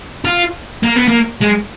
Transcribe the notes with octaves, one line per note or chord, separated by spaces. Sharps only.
F4
A#3
B3
A#3
G#3